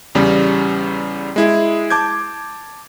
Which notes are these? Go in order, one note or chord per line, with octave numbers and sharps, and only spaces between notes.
E2 C#3 G3
G#3 E4 G#4
A5 D6 G6 G#6